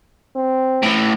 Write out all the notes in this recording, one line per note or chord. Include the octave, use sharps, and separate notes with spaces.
C4
A2 E3